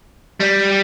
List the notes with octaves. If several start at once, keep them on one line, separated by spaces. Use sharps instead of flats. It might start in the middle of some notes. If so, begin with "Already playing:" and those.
G3